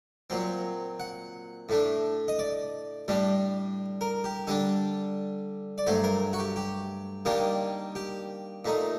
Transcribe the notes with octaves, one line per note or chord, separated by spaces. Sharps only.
A#2 F#3 C4
F#5
A2 A3 D4
D#5
D5
A2 G3 D4
A#4
G4
D3 G3 D4 A4
D5
G2 F#3 A3 C5
A#4
F#4
G4
G4
D#3 G3 A#3 D4
G4
A#2 A3 D#4